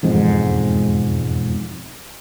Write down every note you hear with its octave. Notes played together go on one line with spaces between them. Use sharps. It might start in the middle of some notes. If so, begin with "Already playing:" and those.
E1 F2 G#2